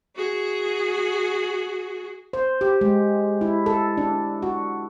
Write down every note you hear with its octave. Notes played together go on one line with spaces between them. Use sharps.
F#4 G#4
C5
G4
G#3
E4
A4
D4
F#4